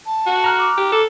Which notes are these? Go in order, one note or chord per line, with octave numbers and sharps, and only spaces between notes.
A5
F#4
A#5 F6 F#6
D6
G4
A4